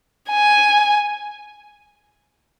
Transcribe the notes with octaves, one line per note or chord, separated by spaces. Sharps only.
G#5